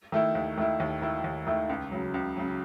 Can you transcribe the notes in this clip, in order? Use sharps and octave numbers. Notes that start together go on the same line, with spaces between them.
D#3 A3 E4
D#2
D#3 A3 E4
D#2
D#3 A3 E4
D#2
D#3 A3 E4
C#2
C#3 F#3
C#2
C#3 F#3